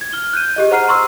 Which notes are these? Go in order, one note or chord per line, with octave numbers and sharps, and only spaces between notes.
G#6
F6 G7
F#6 G6 D#7
G4 G#4 D#5
C5 F#5 A#5 F6 C7 D#7
A#5 C6 C#6 E6